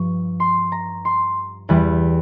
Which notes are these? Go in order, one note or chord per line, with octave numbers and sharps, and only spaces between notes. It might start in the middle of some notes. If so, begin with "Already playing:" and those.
Already playing: G2 F3 C#6
C6
A#5
C6
E2 E3 G3